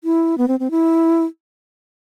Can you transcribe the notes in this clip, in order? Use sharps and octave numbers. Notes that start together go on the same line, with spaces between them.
E4
B3
C4
C4
E4